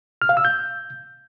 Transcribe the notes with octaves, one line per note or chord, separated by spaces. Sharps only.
F6
F5
E6
G6